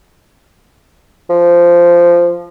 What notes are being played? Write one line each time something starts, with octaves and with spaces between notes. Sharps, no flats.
F3